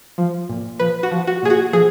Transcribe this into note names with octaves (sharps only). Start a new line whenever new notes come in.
F3
A#2
F3 B4
F#4
F3
F#4
A#2 G#4
F#4
F3 G#4